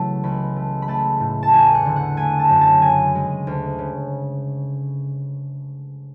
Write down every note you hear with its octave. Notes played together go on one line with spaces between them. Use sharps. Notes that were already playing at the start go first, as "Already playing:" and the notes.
Already playing: C#3 E3 F#3 A3 F#5 A5
C#2 B5
A3
B5
A3 A5
A2
A5
E2 G#5
F#5
D3
F#5
A3 G#5
A5
F#2
A5
C#3 G#5
G#3
D2
C#3